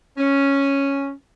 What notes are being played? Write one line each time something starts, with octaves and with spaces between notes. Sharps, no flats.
C#4